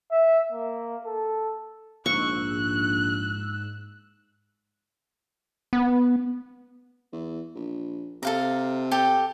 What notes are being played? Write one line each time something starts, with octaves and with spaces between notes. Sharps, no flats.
E5
A#3
A4
A#1 G#2 C#6 E6 F#6
B3
E2
A#1
C3 A4 F5 A#5
G4 A4 G5